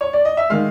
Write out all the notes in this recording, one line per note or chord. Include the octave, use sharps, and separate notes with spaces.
C#5
D5
D#5
E5
D#3 G#3 F5